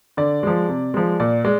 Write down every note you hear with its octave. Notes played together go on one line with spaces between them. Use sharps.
D3 D5
F3 G#3
C3
F3 G#3
A#2 D5
G#3 D5